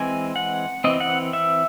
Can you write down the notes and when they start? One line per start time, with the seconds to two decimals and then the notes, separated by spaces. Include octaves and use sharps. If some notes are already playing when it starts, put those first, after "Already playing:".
Already playing: E3 G#3 C4 G#5
0.36 F#5
0.84 E3 C4 D#5
1.00 F#5
1.33 E5